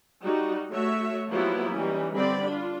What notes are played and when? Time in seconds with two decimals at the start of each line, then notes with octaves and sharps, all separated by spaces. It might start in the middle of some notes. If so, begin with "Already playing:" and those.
0.22 G3 D#4 F#4
0.72 A3 F#4 C#5 E5
1.31 F3 F#3 A#3 B3 E4 G4
1.75 E3 G3 C#4 D#4
2.16 D3 G3 C4 D5 B5
2.48 D4 F4